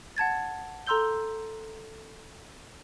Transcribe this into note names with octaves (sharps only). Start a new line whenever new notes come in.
F#5 A5 G#6 A6
A4 A#5 C6 E6 G6 G7